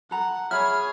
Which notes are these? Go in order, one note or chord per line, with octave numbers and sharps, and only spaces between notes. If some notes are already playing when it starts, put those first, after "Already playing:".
A4 F#5 A#5
G#4 C#5 E5 B5 F6